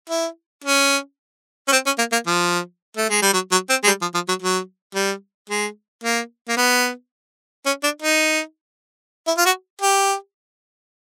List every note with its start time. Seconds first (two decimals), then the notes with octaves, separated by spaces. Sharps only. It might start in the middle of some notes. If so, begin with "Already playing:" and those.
0.10 E4
0.64 C#4
1.68 C#4
1.72 C4
1.86 C#4
1.98 A#3
2.12 A#3
2.26 F3
2.97 A3
3.09 G#3
3.22 G3
3.33 F#3
3.51 F#3
3.69 C4
3.84 G#3
3.87 G3
4.01 F3
4.14 F3
4.28 F#3
4.42 F#3
4.95 G3
5.50 G#3
6.04 A#3
6.48 A#3
6.57 B3
7.66 C#4
7.84 D4
8.02 D#4
9.27 E4
9.38 F4
9.46 F#4
9.81 G4